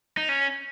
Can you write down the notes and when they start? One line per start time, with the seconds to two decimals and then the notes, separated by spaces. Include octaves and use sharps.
0.17 D#4
0.29 C#4